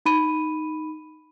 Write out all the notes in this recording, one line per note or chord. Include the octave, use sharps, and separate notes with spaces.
D#4 B5 D#7